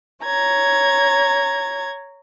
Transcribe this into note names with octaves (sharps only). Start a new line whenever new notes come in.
C#5 A#5 G#6